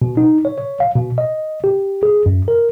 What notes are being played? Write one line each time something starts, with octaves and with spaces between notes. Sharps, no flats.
B2
D#4
C#5
C#5
F5
B2
D#5
G4
G#4
F#2
A#4